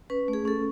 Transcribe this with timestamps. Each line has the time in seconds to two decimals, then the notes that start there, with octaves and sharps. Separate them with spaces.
0.10 C#4 B4
0.28 A3
0.33 G#4
0.45 C#4 A4